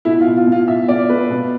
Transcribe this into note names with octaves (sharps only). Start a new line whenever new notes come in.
B2 E4
F4
B2
F4
B2
F4
B2 E5
B2 D5
B2 B4
B2